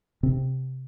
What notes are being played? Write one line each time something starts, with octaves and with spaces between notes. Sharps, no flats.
C3 C4